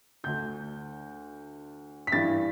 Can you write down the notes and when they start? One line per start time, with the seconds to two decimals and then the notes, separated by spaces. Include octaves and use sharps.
0.24 D2 D3 G6
2.07 B6
2.12 G2 E3 A6